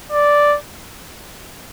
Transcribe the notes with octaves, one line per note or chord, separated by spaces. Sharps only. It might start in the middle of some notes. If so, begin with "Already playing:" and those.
D5